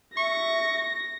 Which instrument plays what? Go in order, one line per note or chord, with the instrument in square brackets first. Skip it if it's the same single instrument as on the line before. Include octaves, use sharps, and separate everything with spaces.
[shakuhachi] E5 [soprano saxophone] C#6 [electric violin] A#6